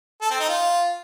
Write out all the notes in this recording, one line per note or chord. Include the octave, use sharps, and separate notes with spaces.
A4
C4
D#4
F4